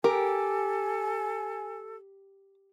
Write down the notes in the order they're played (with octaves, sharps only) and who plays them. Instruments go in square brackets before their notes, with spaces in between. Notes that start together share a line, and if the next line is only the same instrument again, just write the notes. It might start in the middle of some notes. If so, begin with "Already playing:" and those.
[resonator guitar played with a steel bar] G4 [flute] A4 [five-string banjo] A#4 [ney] G#5